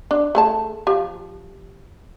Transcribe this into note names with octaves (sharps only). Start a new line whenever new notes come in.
D4
A3 G#4 A5
F3 G4